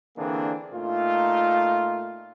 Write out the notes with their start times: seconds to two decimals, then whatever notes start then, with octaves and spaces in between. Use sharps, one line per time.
0.17 D3 E3 A#3 C4 D4 G#4
0.73 A#2 A3 D#4 F4